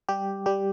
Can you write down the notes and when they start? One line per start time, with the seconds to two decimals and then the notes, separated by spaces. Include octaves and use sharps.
0.09 G3 G4
0.46 G3 G4